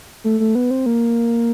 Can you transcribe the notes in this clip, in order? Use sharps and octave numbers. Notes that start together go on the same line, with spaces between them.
A3
A3
B3
C4
A#3